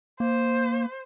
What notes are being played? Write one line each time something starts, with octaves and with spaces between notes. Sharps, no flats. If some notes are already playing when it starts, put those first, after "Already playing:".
A#3 C5